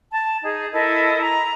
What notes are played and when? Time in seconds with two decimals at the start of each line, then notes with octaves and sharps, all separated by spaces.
0.12 A5
0.43 D#4 G#4
0.73 E4 A4 A#4 D#5
1.21 A#5